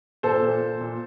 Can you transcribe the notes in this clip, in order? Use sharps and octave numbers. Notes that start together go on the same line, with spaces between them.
A#2 A4 C5
A#2
A#2
A#2